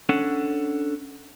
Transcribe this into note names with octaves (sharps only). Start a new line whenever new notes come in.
C#4 D4 A4 F#5